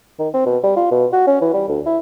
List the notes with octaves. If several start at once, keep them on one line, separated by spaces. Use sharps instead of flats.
D#3
C4
B2
G3
F4
B2
F#4
C#4
E3
G3
D2
E4